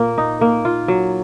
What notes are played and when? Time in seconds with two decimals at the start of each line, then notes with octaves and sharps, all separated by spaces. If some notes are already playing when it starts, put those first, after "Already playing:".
Already playing: A#2 A#3
0.18 D#4
0.41 A#3
0.65 F4
0.88 F#3